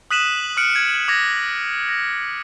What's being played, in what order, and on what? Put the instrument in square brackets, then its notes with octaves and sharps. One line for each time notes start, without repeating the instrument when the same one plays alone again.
[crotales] D#6 F#6 B6 D#7 E7 F#7
D#6 F6 F#6 C#7 D7
G#6
D6 G#6 A#6
A#6